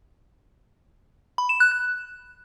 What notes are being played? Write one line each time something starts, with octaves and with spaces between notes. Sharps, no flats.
B5
E7
F#6
F#6